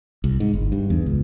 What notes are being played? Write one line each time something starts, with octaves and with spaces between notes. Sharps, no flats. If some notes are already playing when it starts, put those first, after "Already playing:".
C2
G#2
G1
G2
E2
C#2